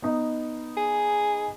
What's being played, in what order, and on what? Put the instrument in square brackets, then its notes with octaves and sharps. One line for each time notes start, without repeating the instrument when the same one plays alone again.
[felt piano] B3 D#4
[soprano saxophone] G#4